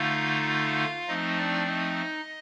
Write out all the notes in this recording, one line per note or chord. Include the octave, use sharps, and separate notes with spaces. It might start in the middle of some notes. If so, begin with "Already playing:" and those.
Already playing: D3 A3 D#4 F4 F5
F3 A3 C4 D#4 D#5
D4 D5
D#4 D#5